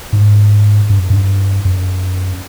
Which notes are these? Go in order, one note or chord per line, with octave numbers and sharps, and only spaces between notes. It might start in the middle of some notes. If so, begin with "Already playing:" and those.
G#2
G2
F#2
G2
F#2